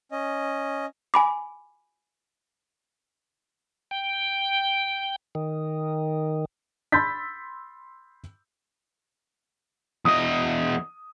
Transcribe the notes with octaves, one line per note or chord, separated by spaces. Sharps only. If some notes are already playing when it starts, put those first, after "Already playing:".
C#4 D#5
G#5 B5 D6
G5
D#3
B5 C6 E6 G6 A6 B6
E2 D#5 D#6